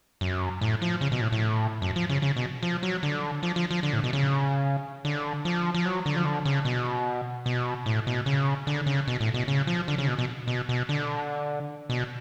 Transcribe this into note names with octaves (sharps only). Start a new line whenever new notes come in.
F#2
A2
F3
C#3
B2
A2
A2
F#2
F3
C#3
C#3
B2
F3
F#3
D3
F3
F3
F3
D3
A2
B2
C#3
D3
F3
F3
F#3
D3
F3
D3
C#3
B2
B2
A2
B2
C#3
D3
C#3
B2
A2
B2
C#3
F3
D3
C#3
B2
B2
B2
B2
D3
B2